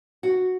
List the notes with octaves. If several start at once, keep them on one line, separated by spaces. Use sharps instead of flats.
F#4